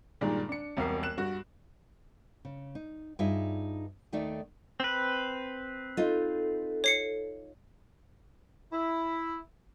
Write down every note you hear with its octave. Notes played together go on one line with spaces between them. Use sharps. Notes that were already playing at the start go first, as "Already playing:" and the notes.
G2 A#2 D#3 G#3 D5
D4 C#7
E1 C2 A#4 C7
F#6 E7
G2 F#4
C#3
D#4
G2 D#4 F4 G#4 E5
D#2 D#3 A3 D#4 D5 E5
C4 B4
D#4 F4 A4
C#5 C7 C#7
E4